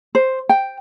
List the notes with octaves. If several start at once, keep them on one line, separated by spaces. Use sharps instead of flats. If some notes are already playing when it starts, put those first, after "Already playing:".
C5
G5